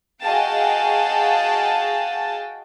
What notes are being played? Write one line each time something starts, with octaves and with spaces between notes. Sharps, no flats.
F#4 G#4 D#5 F5 G5 A5